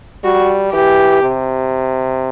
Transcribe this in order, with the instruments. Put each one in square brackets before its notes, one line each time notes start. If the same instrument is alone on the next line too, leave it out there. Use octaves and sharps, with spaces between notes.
[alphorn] G3 [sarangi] F#4
[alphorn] E3 [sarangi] G4
[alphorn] C3